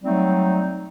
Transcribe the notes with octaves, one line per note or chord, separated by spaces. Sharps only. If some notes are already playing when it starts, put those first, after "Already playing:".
F#3 G3 A3 C4 D#4